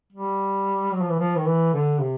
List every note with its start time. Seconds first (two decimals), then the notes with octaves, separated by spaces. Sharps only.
0.12 G3
0.93 F#3
1.01 F3
1.10 E3
1.19 F3
1.37 D#3
1.46 E3
1.73 D3
1.99 C3